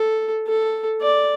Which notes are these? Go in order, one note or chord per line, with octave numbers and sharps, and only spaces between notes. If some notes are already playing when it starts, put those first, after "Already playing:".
Already playing: A4
A4
D5